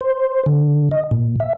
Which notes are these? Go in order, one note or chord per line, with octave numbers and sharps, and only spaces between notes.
C5
D3
D#5
A#2
E5